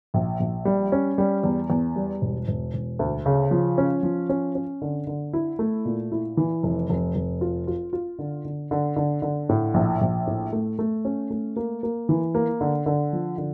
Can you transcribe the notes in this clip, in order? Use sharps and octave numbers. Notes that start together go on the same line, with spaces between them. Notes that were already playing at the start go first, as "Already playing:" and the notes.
A#1
A#1
G3
C#4
G3
E2
E2
G3
E1
E1
E1
D2
C#3
F3
C#4
F3
C#4
C#4
D3
D3
E4
A3
A#2
E4
E3
F1
F1
F1
F4
F4
F4
D3
D3
D3
D3
D3
A2
A#1
A#1
A2
A3
A3
C#4
A3
A#3
A#3
E3
A#3
D3
D3
F3
D3